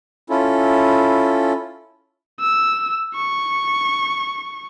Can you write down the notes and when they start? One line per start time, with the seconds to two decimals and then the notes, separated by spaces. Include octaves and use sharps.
0.30 C#4 E4 F4 A4
2.40 E6
3.15 C#6